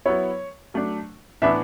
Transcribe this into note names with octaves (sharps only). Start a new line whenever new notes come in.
F#3 B3 E4 C#5
F#3 A3 D4
A2 E3 B3 D4 E5